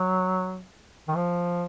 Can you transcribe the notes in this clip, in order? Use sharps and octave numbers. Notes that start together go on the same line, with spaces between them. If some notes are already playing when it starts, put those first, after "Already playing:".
Already playing: F#3
D#3
F3